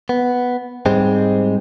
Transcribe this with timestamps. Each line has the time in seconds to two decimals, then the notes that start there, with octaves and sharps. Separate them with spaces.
0.09 B3
0.86 G#2 G3 G#3 C4